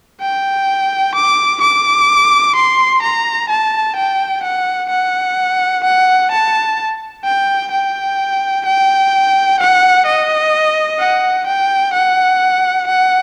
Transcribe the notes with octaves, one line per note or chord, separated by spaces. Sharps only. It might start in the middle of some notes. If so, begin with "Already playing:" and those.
G5
D6
D6
C6
A#5
A5
G5
F#5
F#5
F#5
A5
G5
G5
G5
F#5
D#5
F#5
G5
F#5
F#5